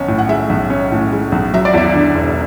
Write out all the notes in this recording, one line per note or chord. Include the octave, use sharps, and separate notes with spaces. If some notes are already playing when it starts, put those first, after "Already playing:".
Already playing: B1 C#4
A2
F#5
G#3 E5
B1
C#4
A2
G#3
B1
F#3 E5
D5
E2 E5
D3
E1